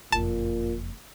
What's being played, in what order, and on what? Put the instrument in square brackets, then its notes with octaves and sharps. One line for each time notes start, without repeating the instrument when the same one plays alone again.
[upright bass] F#1 F2 [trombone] A#2 [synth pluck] A5